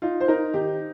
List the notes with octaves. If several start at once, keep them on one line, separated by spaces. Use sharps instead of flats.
D#4 F4
C5
D#4 A#4
D#3 G4